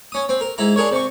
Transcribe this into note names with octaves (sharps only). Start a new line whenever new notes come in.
C#4 D#6
C4
A#4
G#2 E4 A#5
D4 G#4 A#4 C#5
C3 C#6